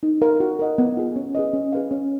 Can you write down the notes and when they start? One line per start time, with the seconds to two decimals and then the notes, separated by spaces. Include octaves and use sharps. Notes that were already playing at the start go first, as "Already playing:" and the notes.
0.03 D#4
0.22 A#4 F5
0.40 F#4
0.59 A#4 D#5 F#5
0.78 B3
0.97 F4 G#4
1.16 C#4
1.35 G#4 B4 D#5
1.53 C#4
1.73 G#4 B4 F5
1.91 C#4